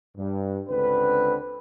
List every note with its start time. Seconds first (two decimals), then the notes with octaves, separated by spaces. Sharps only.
0.17 G2
0.69 C#2 D3 C4 B4